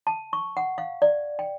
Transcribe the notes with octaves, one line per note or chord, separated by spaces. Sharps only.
A5
C#6
F#5
F5
D5
G5